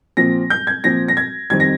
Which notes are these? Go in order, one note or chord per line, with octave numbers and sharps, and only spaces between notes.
A#2 F3 C4 A#6
G6
G#6
A#2 F3 C4 A#6
A#6
G#6
F2 D#3 G3 C4 G#6
A#6